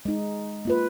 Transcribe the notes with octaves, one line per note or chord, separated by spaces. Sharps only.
G#3 D#4
A#3 F4 B4